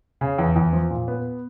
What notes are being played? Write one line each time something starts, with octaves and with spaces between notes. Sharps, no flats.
C#3
E2
E2
F3
A#2
B3